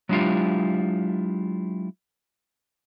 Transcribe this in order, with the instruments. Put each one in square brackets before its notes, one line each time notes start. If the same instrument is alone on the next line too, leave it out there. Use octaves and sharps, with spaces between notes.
[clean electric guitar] F#3 G#3 D4 E4 F4 G4